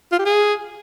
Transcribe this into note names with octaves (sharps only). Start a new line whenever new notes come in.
F4
G4
G#4